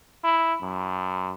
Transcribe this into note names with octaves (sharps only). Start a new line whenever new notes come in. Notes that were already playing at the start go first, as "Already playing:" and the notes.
E4
F#2